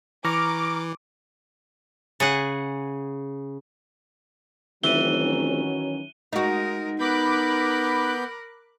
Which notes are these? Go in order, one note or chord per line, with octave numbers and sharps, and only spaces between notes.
E3 A#5 C#6 D6 F6
C#3 G#4 F#5
F1 D#3 E3 F#3 C#4 D#7 G7
G#3 D#4 F#4 A#4
B3 A#4 B5 D6 F#6 G6